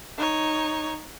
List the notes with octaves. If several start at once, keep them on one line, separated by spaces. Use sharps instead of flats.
D#4 C#5